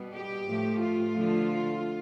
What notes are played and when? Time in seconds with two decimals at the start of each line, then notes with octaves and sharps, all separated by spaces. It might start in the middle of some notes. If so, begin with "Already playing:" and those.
Already playing: B2 G3 B3
0.12 G4
0.45 A2 F3 A3
0.79 F4
1.12 D3 F3 A3